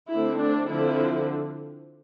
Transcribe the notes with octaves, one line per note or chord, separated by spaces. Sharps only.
D3 A3 C4 E4
D4
D3 F3 C4 E4